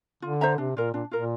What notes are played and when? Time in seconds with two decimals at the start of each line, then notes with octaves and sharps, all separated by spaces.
0.22 D3 F4
0.41 C5 E5 A#5
0.58 C3 D4
0.76 A#2 F4 A#4
0.93 A#2 D4
1.11 A#2 F4 A#4